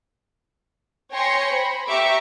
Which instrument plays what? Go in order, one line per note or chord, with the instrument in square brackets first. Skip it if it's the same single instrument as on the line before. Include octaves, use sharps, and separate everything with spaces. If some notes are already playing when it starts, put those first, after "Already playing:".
[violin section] C#5 G5 G#5 C6 A#6 C#7
C5 B5
G4 E5 A#5 C#6 D6